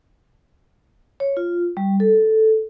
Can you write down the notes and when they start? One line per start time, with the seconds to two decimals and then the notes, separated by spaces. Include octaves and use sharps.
1.20 C#5
1.37 F4
1.77 G3
2.00 A4